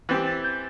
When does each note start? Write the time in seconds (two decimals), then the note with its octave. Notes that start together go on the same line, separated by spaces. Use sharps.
0.09 E3 C4 G4 A6
0.27 A6
0.44 G6